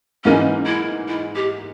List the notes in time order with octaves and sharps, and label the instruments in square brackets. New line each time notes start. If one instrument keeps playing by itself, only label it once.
[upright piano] G#2 E3 A#3 D#4 [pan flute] C#4
[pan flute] E4
E4
G4